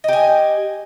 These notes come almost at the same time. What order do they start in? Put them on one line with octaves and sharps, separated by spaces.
D#5 G4 G#5